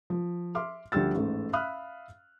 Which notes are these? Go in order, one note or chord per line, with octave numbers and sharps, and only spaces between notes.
F3
E5 C6 D6 F6
D2 F3 G3 G4 E6 A6
A1 G#2 A3
E5 F5 B5 D#6 F6 F#6